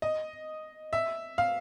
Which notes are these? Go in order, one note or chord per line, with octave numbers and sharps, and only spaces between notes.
D#5
E5
F5